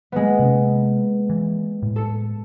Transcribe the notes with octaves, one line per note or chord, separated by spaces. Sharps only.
G#3 A#3 B3
C3 C#4
E3
A2
A4 C#7